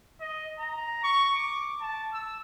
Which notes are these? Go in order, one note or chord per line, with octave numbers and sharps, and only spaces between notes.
D#5
A#5
C#6
D6
A5
E6